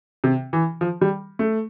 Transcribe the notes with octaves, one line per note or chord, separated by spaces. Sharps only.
C3
E3
F3
G3
A3